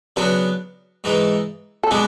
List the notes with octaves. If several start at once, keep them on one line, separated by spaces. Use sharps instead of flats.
C#3 F#3 B3 D4 B4
G#2 E3 G#3
A4
B2 G#3 B3 D4 G#4